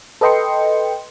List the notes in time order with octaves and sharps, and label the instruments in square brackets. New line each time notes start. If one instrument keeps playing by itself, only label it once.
[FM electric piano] A4 B4 D#5 G5 C6 C#7